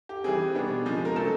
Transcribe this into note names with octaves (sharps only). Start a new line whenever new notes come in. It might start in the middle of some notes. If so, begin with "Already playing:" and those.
G4
E3 G3 C4 G#4
B2 G3 B3 D4
C#3 F3 G#3 C4
A#4
C#3 F#3 A3 A4